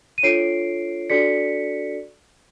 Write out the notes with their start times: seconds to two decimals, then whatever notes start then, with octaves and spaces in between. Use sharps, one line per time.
0.18 D#7
0.23 D4 F4 A4 C#5 C7 D7
1.10 D4 F#4 A4 D5 B6 C#7